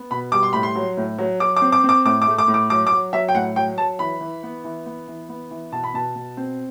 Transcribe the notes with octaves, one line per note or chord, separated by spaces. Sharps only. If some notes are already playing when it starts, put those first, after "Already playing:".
Already playing: B3
B2 B5
G3 D6
C6
A2 B5
C6
F#3
A2
F#3
F#3 D6
D6
C4
D6
C4
D6
A2 D6
D6
A3
D6
A2
D6
F#3 D6
D6
F#3
F#3 E5
G5
A2 F#5
F#3 G5
F#3 A5
E3 B5
E3
B3
E3
B3
E3
B3
E3
B2 A5
B5
B2 A5
B2
C4